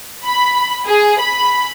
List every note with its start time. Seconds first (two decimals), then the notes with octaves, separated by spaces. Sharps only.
0.25 B5
0.86 G#4
1.19 B5